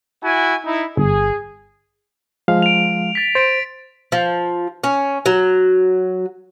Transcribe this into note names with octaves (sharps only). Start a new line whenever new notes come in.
E4 F#4 G#5
D#4 E4
G1 G#4
F3 G#3 F5
D7 F7
A6 B6
C5 A6 D7 F7
F3
C#4
F#3